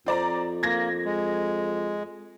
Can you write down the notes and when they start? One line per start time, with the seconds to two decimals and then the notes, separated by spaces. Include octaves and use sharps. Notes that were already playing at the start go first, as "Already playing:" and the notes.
0.06 F2 C4 D5 A#5
0.63 A#3 G#6 A#6
1.05 G#3